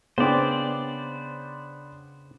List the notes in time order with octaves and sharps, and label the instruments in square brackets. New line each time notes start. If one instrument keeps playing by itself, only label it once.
[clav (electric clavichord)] C#3 C4 [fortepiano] B3 D4 [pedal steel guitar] C5 D5